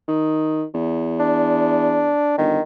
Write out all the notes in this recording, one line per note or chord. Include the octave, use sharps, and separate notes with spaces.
D#3
E2
D4
G1 D#3